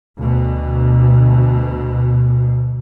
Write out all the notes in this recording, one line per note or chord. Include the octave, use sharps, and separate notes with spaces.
D2 B2